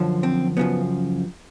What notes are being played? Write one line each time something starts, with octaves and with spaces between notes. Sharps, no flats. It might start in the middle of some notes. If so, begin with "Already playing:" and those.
Already playing: F#2 D3 F3
C4
F#2 C#3 F3 B3